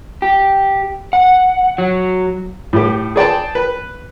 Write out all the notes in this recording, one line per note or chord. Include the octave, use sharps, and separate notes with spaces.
G4
F#5
F#3
A2 G4
G#4 D5 G5 A5
B4